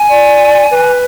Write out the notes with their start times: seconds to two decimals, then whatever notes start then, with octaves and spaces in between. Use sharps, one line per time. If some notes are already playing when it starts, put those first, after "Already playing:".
Already playing: G#5
0.09 D5
0.71 B4